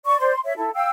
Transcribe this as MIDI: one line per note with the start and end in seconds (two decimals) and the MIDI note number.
0.05 0.17 74
0.05 0.17 85
0.19 0.31 72
0.19 0.31 74
0.19 0.31 84
0.31 0.40 84
0.44 0.56 73
0.44 0.56 76
0.56 0.70 64
0.56 0.70 69
0.75 0.90 77
0.75 0.90 79
0.75 0.90 88